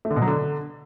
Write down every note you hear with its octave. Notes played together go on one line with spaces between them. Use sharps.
A3
D3
B2
F#3
D3